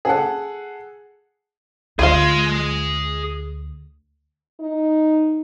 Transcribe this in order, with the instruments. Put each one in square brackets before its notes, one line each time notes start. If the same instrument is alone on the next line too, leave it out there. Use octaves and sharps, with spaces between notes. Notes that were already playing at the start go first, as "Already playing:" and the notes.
[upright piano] G#4 A4 F#5
[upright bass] D2 [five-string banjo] F4 F5 [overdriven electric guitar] G#4 C6
[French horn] D#4